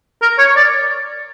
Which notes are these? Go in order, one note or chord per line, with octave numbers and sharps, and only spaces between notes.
A#4
C#5
D5